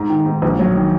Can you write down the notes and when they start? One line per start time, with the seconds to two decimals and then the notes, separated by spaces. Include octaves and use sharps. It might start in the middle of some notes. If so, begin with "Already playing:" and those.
Already playing: G#2 A#5
0.09 D#3
0.26 G#2
0.42 A#1
0.59 F#3
0.76 D#3